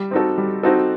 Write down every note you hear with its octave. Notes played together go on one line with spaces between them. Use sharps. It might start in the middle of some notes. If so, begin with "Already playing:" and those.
Already playing: G3
C4 D#4 F#4 A4
G3
C4 D#4 F#4 A4